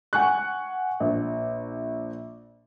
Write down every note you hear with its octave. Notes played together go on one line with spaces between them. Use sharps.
F#5 G#5 C#6 F#6
A#1